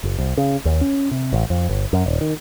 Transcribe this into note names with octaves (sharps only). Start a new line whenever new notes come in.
F#1
C2
C#3
D#2
C#4
C3
A1
F2
G1
F#2
D#1
D#3